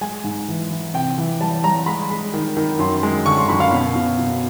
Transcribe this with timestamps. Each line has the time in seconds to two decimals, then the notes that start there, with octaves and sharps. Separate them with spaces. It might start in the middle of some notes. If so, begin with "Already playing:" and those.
0.01 G#3 G#5
0.24 G#2
0.48 E3
0.70 E3
0.94 C3 G5
1.18 E3
1.41 G3 A5
1.64 G3 A#5
1.86 G#3 B5
2.10 G#3
2.34 D#3
2.57 D#3
2.79 F#2 C6
3.03 G#3
3.26 D3 C#6
3.38 C6
3.49 F#2 B5
3.60 F5
3.72 B2
3.95 B2
4.19 B2